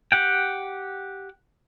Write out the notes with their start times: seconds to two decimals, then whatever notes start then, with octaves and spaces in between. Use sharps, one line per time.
0.12 G4 F#5 G5